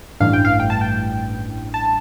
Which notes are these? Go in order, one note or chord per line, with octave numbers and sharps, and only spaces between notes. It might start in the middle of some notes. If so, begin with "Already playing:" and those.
A1 G2 E3 F5
G5
F5
G5
A5
G5
A5